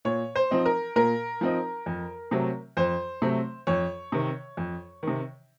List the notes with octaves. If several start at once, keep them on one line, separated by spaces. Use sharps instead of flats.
A#2 C#5
C5
F3 C4 D#4
A#4
A#2 A#4
F3 C4 D#4
F2
C3 F#3 A3 C4
F2 C5
C3 F#3 A3 C4
F2 C#5
C3 D#3
F2
C3 D#3